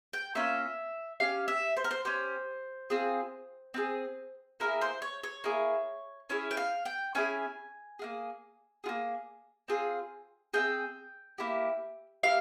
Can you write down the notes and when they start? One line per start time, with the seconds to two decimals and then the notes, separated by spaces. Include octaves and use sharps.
0.13 G5
0.35 A#3 C#4 F4 E5
1.20 C#4 G4 F5
1.48 E5
1.77 C5
1.84 A#4
1.91 C5
2.05 C#4 G4 C5
2.90 C4 F4 G#4
3.74 C4 F4 G#4
4.60 A#3 E4 G#4 A#4
4.81 C5
5.02 C#5
5.24 C#5
5.44 A#3 E4 G#4
6.29 C#4 E4 G#4 C#5
6.51 G5
6.57 F5
6.85 G5
7.15 C#4 E4 G#4 G#5
7.99 A#3 F4 G#4
8.84 F4 G#4
8.89 A#3
9.68 C4 F4 G#4
10.53 C4 F4 G#4 G5
11.38 A#3 E4 G4
12.23 A#3 E4 G4 F5